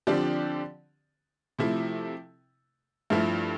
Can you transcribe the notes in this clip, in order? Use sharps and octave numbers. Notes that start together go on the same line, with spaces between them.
D3 F3 C4 G4 D5
C3 F3 A3 E4
G2 F3 A3 E4